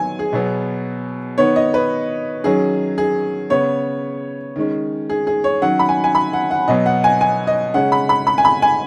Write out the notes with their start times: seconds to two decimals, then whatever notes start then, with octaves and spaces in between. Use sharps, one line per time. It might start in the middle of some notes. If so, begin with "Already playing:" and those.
Already playing: D#3 F#3 B3 G#5
0.19 G#4
0.33 B2 F#3 B3
1.38 D#3 B3 C#5
1.56 D#5
1.74 B4
2.44 D#3 F#3 C#4 G#4
2.98 G#4
3.50 C#3 B3 C#5
4.56 D#3 G#3 C#4
5.10 G#4
5.27 G#4
5.44 C#5
5.62 D#3 F#3 C#4 F#5
5.79 B5
5.89 G#5
6.04 G#5
6.15 B5
6.33 F#5
6.51 F#5
6.68 B2 F#3 B3 D#5
6.86 F#5
7.04 G#5
7.21 G#5
7.47 D#5
7.74 C#3 G#3 C#4 F#5
7.92 B5
8.09 B5
8.27 B5
8.38 G#5
8.45 B5
8.62 G#5